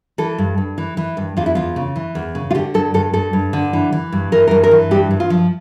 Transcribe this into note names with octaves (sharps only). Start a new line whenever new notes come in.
E3 A4
G2
G2
E3
E3
G2
E2 F4
E4
E2 F4
C#3
E3
E2
C#3
F4
D3 G4
G2 A4
G2 A4
G2 A4
G2
D3
E3
E3
G2
E3 A#4
A#4
G2
A#4
E3
G2 G4
G2
F4
F3